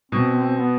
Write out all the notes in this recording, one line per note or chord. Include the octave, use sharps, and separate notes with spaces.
B2 C4
C4
B3